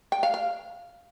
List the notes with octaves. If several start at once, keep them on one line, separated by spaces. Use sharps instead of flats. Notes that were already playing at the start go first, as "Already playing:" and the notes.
G5
F5
F5